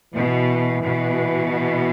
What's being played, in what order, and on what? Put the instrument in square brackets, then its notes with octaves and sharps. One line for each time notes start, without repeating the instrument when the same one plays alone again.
[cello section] B2 [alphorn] E3
[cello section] B2
[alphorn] E3